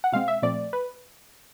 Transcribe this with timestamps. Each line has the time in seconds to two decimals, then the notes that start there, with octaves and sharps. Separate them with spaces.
0.04 F#5
0.12 B2 G#3 C4 F5
0.28 E5
0.42 A#2 F3 A3 C4 D5
0.73 B4